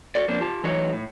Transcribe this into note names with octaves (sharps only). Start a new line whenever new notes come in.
F#4 A4 D5
F2 A#3 C4 D4
F4 G4 A5
E3 F#3 A3 D#4 F#4 C#5
A2